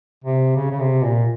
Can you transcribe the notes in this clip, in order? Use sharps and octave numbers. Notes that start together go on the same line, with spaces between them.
C3
C#3
C#3
C3
A#2